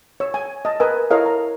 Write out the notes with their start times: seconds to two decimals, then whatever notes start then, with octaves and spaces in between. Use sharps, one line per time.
0.20 C#5 E6
0.34 G#5
0.65 D#5 A5
0.80 A#4 B4 D#5 G#5 E6
1.11 E4 A4 A#4 C#5 D#5 F5
1.26 A#5